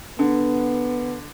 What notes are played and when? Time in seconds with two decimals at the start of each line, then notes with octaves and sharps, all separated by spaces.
0.19 D3 B3